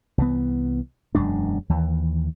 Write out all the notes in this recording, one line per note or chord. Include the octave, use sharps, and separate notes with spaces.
C2 E3 B3
E1 F#2 G#3 D4
D#2 E3